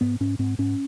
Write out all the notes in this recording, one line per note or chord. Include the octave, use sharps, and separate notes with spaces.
G#2 B3
G#2 C#4
G#2 C4
G#2 C#4